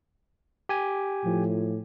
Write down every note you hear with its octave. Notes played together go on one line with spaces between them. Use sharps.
G4 G#5
A2 F3